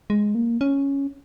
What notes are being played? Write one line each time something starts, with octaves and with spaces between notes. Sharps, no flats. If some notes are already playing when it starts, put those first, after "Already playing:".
G#3
A#3
C#4